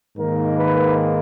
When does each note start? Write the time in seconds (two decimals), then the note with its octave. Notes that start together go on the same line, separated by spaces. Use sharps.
0.17 G#2 D#3 A#3 A#4
0.58 B4